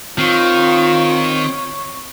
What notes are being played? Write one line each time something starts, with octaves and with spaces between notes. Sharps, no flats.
D#3 C4 F4 C#5